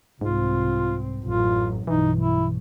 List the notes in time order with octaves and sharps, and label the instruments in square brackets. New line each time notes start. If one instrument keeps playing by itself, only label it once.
[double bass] C2 C4 [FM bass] G#2 [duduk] F4
[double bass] A1 F#2 [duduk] F4
[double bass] B1 G2 [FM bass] E3 [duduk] D#4
[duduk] E4